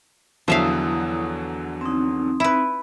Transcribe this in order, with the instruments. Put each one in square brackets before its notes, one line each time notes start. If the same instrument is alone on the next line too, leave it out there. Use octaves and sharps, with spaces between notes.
[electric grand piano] E2 D3 F#3 [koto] F3 E5 F5 [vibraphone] E4 D#6
[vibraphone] C4 D#4
[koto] E4 B4